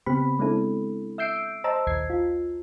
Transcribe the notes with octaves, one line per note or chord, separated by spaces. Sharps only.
C#3 B3 C4 G4 B5
G#3 B3 C4 D4 E4 A4
E5 E6 G6 C7 D7
C5 D#5 A5 A#5 E6
A#1 D#2 G#6 C7
F4